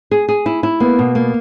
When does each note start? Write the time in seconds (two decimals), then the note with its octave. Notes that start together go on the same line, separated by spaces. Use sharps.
0.11 G#4
0.29 G#4
0.46 E4
0.63 E4
0.80 A#3 B3
0.99 B2
1.15 A#3